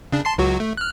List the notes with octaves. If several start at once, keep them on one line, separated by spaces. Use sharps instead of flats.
C#3 D4
A5 C6 C7
C#2 F#3 F#4
A3
F6 F#6